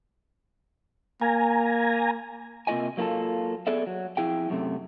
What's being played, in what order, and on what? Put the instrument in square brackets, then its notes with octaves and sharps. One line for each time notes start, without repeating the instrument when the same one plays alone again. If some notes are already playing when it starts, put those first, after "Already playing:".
[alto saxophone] A#3 [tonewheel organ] G#5 A#5
[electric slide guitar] C3 A#3 F4 G4 D#5 G#5
F#3 A#3 C4 F4 A4
B3 G#4 A4 D5 E5
F#3
F2 E4 G#4 G5
F#2 C3 A3